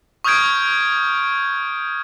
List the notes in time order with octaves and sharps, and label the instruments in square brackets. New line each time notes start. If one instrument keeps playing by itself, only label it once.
[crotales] C#6 D#6 F6 G6 G#6 D7